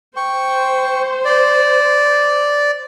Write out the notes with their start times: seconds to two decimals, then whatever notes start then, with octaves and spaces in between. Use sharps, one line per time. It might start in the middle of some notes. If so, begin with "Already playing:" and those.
0.16 C5 G5 C#6
1.25 D5